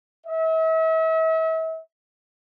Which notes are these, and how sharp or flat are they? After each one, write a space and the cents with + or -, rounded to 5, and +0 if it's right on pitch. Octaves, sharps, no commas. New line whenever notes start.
E5 -40